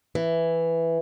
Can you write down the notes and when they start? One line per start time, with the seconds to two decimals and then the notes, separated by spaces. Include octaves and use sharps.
0.15 E3